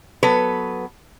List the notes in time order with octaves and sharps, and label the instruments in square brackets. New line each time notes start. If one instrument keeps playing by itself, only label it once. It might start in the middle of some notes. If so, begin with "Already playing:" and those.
[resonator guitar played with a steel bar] F#3 B3 A4 B4